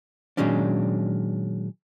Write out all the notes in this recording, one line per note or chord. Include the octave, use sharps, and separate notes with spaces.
A#2 D#3 F#3 G#3 C#4 D4